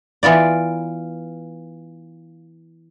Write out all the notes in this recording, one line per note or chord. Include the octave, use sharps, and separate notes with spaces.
E3 B3 F4 D5